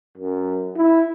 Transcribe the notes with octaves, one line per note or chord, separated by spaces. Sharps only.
F#2
E4